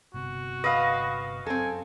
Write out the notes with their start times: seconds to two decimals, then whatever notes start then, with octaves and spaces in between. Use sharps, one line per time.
0.14 G1 C3 B3 F#4
0.64 B4 D#5 F5
1.46 F#2 C4 A4 G#5